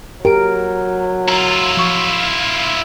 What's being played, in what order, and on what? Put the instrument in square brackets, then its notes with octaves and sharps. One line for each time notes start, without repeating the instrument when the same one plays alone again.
[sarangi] F#3 [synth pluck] G4 D7 [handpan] A#4
[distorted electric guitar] E4 F4 [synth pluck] A#5
[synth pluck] F3 C#6